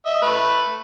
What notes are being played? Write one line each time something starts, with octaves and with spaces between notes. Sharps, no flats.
D#5 E5
A3 B4